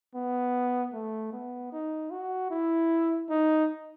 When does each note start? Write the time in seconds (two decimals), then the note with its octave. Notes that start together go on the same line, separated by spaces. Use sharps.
0.15 B3
0.93 A3
1.32 B3
1.72 D#4
2.11 F#4
2.50 E4
3.30 D#4